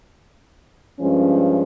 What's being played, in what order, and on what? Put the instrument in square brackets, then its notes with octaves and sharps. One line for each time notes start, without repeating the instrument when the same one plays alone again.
[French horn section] G2 F3 G#3 C#4